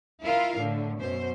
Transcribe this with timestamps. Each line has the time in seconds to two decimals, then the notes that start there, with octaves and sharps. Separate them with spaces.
0.24 E4 F4 A#4 F5
0.59 A2 D3
0.99 F#2 B2 C5